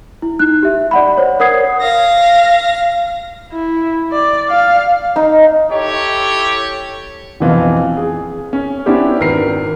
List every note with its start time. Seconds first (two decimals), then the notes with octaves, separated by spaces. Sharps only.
0.22 E4
0.39 D#4 F#6
0.63 G4 E5
0.91 D5 F#5 B5
1.17 C5 C#5
1.40 A#4 C#5 F#5 D#6 G#6 C7
1.81 F5 A#6
3.53 E4
4.12 D5
4.50 F5
5.16 D#4
5.69 E4 G4 A4 C#5
7.40 A#1 F2 B2 E3 C4 F4
7.97 G#4
8.53 C#4
8.86 B3 C#4 D4 E4 G4 C5
9.20 G#1 A#4 B4 C7